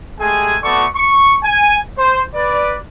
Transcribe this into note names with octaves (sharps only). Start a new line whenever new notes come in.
G#3 A3 G4 G#4 G#5
A3 B3 F#4 A4 D5 C#6
C#6
G#5
C5
B4 D5